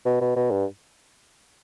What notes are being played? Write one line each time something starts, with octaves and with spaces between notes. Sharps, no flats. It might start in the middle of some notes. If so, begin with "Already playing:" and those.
B2
B2
B2
G2